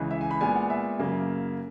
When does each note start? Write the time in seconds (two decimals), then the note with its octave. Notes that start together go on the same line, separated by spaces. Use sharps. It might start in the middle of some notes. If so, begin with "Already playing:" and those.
Already playing: C#2 C#3 E3
0.11 E5
0.21 G#5
0.31 B5
0.41 A#2 G#3 B3 G#5
0.56 F#5
0.70 E5
0.99 F#2 C#3 F#3 A#3